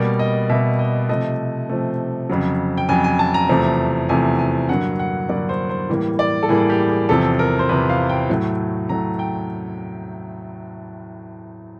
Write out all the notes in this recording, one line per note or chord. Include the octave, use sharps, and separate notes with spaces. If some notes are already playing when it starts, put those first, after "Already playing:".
Already playing: B2 G3 A#3 D5
D#5
B2 G3 A#3 E5
D#5
C3 F3 A3 D#5
C3 F3 A3
F2 C#3 F#3
G5
F2 C#3 F#3 G#5
G#5
A5
A#5
E2 C3 F3 A3
E2 C3 F3 A3 G#5
G#5
G2 D3 F#3 A#3 F#5
F#5
G2 D3 F#3 A#3 D5
C5
C5
A2 E3 G3 A#3
D5
A4
A2 E3 G3 A#3 G#4
G4
G#4
E2 C3 F3 A4
A#4
C5
E2 C3 F3 B4
F5
G5
A2 F#3 A3
A2 F#3 A3 A#5
G5